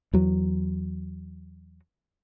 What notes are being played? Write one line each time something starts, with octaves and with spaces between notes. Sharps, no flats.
E2 F#3